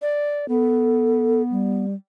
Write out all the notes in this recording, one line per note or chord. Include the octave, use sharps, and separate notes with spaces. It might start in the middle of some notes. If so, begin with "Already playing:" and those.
D5
B3 A4
G3